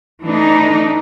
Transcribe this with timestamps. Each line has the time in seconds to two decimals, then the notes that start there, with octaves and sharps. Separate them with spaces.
0.23 E3 A3 D4 D#4